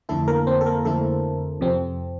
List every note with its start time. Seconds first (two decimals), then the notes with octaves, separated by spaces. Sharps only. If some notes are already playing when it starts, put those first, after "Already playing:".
0.09 F2 D3 A3 E4 A4
0.28 A#3 A#4
0.47 C4 C5
0.61 A4
0.66 A#3 A#4
0.85 F2 D3 A3 E4 A4
1.61 F2 C3 F3 C4